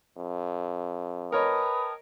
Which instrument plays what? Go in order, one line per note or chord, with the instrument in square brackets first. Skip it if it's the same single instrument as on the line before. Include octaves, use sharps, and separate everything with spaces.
[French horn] F2
[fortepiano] A#4 C#5 D#5 [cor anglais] B4 [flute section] G5 A5 D#6